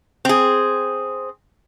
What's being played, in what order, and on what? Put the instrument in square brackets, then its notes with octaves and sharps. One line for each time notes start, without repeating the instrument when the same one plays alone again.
[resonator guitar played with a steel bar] C4 G#4